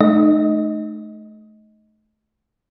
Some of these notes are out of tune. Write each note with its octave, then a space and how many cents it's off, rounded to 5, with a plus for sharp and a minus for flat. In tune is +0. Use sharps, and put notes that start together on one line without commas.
A3 -30 D#4 -30 D#5 +15